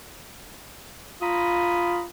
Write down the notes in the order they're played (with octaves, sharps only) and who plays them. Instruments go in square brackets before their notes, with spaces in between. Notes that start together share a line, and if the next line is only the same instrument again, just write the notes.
[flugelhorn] F4 [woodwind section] A#5 B5 D#6